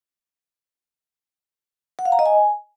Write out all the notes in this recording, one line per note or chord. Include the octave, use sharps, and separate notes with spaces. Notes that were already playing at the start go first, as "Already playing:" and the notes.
F#5
F5
A#5
D#5
G#5